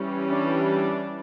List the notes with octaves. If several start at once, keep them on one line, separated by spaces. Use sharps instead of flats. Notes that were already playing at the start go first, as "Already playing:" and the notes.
Already playing: E3 G3 C#4
D4